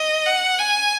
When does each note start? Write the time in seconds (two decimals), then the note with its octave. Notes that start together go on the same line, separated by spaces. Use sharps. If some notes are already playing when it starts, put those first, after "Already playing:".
Already playing: D#5
0.26 F#5
0.59 G#5